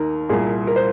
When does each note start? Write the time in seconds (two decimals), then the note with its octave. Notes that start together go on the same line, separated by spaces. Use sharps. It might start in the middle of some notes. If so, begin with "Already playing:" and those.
Already playing: D#2 D#3 A#4
0.29 C2 A#2 G#4
0.67 A#4
0.76 C5